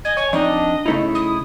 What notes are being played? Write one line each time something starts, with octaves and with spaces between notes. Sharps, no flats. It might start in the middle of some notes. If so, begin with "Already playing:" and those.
D#5 G#5
C#5 G#5
F2 D4 D#4 D#5
C#3 A3 D#4 E4
D#6